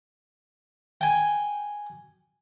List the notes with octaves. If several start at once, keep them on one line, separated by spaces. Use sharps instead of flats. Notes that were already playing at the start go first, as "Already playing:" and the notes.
G5 G#5